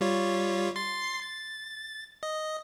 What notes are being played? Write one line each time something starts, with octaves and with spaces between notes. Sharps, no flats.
G3 F4 C#5
C6 A6 C7
A6
D#5